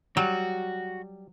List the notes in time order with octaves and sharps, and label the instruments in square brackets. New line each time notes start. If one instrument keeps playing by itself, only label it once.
[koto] F#3 [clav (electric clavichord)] G3 [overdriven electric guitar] F#4